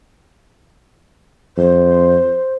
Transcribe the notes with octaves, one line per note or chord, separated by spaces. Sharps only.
F2 C5